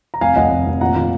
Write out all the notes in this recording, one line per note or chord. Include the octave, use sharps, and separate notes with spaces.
A#5
F1 F5 G#5
F1 D#5 F#5
F1
F1
A#2 F#5 A#5
A#2